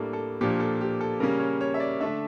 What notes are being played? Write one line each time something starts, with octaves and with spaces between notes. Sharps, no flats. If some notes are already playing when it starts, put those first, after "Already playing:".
Already playing: A2 G3 A#3 D4 A4
A4
A#2 F3 A#3 D4 G4
A4
G4
A4
C#3 G3 A#3 C#4 A#4
C#5
C#5
E5
D5
D3 A3 D4 E5